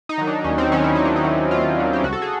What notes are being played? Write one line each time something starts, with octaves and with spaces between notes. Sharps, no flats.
D#4
D#3 F#3
D4
D#2 C#4
C4
D#3 F#3 C#4
E4
D#2 D#4
D4
D#4
D#3 F#3
D#2 F4
D#3 F#3
G4
C#2 F#4
A4
G#4